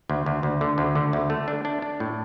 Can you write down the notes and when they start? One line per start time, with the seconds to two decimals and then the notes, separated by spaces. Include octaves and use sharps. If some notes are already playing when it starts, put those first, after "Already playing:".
0.10 D2
0.26 D2
0.43 D2
0.61 D3
0.78 D2
0.95 D3
1.13 D2
1.30 A3
1.48 D4
1.65 D4
1.82 D4
2.00 A2